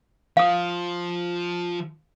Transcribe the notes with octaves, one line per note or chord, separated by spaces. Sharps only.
F3 F5 D#6